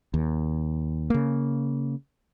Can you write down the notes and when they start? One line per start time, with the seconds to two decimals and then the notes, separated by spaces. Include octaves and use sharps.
0.14 D#2
1.10 C#3 A#3